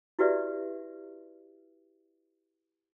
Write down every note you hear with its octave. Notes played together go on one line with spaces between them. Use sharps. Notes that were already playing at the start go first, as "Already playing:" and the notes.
E4 F#4 G4 B4 D5 E5